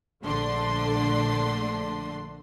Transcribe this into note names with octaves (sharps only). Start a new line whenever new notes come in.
A#1 D3 A3 D4 C6